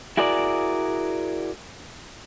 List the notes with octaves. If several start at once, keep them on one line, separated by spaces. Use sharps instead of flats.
E4 F#4 G#4 A#4 D5